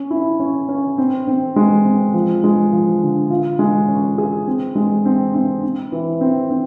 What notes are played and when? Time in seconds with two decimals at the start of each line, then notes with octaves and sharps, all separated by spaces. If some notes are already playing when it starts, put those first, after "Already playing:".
Already playing: C#4
0.11 E4
0.40 C#4
0.69 C#4
0.98 C4
1.27 C4
1.56 G#3
1.85 C4
2.14 F3
2.44 G#3
2.72 F3
3.02 D3
3.30 F4
3.59 G#3
3.88 C#4
4.18 G#4
4.47 C4
4.75 G#3
5.05 C4
5.35 C4
5.64 C4
5.92 E3
6.21 C4
6.51 C4